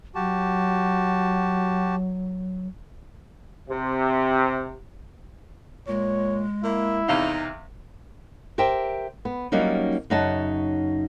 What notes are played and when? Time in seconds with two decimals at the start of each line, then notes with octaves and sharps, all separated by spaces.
0.15 F#3 F#4 G4 A5
3.69 C3
5.88 A#2 G#3 C#5
6.64 A#3 E4
7.08 E2 C3 D#4 F5
8.58 G4 A#4 C5 E5 G5
9.25 B3
9.52 F#3 G3 A#3 C#4 D#4
10.10 F#2 C#3 D#4 C#5 F#5 A5